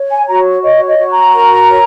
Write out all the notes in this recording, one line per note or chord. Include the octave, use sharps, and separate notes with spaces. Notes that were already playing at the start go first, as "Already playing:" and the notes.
Already playing: C#5
G#5
F#4 A#5
C#5 D#5
D#5
F#4
A#5
A#4
C#5